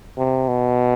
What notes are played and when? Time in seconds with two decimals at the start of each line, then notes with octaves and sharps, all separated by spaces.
0.18 C3
0.48 B2